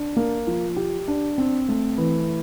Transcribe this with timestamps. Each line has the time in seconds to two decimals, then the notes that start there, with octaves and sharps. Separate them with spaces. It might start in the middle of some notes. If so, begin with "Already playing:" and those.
Already playing: D4
0.17 A#3
0.47 F3
0.77 G4
1.08 D4
1.38 C4
1.69 A3
1.98 E3